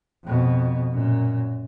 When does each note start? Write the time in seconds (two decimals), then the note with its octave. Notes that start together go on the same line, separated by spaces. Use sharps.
0.25 F2 B2
0.93 F#2 A#2